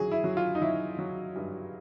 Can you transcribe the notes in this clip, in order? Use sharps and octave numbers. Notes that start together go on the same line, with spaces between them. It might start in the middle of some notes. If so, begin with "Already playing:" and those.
Already playing: F#3 G#4
E4
F#3
F4
D#4
F#3 E4
F#3
G2